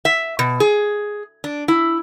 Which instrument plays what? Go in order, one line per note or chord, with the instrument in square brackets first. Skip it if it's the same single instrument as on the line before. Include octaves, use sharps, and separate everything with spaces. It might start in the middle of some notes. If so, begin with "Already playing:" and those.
[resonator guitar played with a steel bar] E5
B2
G#4
D4
E4